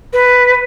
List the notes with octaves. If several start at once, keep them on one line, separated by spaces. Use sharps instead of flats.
B4